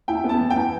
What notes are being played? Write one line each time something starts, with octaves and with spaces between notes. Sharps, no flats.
E4 G5
B3
A5
E3
G5
E3